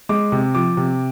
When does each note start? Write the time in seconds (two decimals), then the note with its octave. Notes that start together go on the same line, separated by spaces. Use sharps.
0.09 G#3 D6
0.32 C3
0.55 F3 D6
0.77 C3